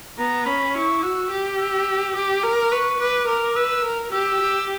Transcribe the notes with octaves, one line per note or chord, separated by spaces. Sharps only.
B3 A#5
C#4 B5
E4 C#6
F#4 E6
G4
E6
G4 D6
A#4
B4 C#6
B4 D6
A#4 D6
B4 E6
A#4
G4 E6
G4